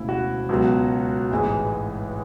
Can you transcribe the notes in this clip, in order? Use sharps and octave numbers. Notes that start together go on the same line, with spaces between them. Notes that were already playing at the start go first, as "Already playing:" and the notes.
Already playing: E1 D2 C#3 E4
F#4
C#2 B2 F#3
A1 G#2 E3 G#3